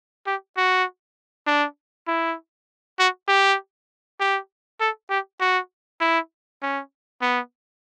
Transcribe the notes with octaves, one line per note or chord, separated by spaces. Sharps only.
G4
F#4
D4
E4
F#4
G4
G4
A4
G4
F#4
E4
C#4
B3